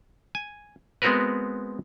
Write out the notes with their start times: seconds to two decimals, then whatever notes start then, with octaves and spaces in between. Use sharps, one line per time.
0.35 G#5
1.02 G#3 B3 C4 F#4 A#4 B4